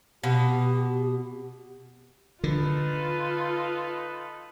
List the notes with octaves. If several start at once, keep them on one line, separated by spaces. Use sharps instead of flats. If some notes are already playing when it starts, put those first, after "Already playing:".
B2 G4
D3 D#4 F4 A4 B4